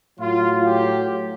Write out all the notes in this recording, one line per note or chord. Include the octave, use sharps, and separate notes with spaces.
A2 F#3 F4
G4